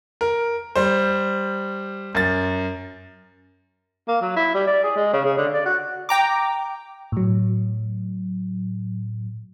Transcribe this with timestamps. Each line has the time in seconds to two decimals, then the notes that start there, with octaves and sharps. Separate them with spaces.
0.21 A#4
0.76 G3 C5
2.15 F#2 A6
4.08 A#3
4.21 F#3
4.36 E4
4.54 G3
4.67 D5
4.83 G#4
4.96 G#3
5.13 C#3
5.25 C#3
5.37 D3
5.54 D5
5.65 F#4
6.09 G5 A#5 D6
7.12 A2 F#3